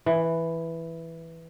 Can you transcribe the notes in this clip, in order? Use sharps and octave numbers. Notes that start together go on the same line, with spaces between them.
E3